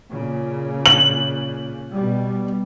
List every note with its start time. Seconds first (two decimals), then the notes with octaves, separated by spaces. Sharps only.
0.10 A#2 C#3
0.86 F#7
1.94 B2 G3